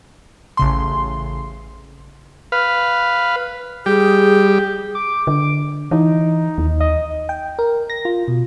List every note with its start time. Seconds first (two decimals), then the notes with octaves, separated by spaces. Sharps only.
0.57 A1 C#3 C6
2.52 B4 F5
3.86 G3 G4 G#4
4.95 D6
5.27 D3
5.91 E3 D#4
6.58 D#2
6.80 D#5
7.29 G5
7.59 A#4
7.90 A#6
8.05 F4
8.28 B2